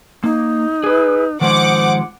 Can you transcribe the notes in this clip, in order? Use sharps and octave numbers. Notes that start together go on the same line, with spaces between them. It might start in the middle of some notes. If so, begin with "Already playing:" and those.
A#3 D#4
G#4 B4
D#3 F3 G#3 C5 F#5 D6